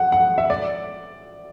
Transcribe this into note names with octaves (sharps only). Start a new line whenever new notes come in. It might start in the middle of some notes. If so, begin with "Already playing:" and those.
Already playing: F#5
F#5
E5
D5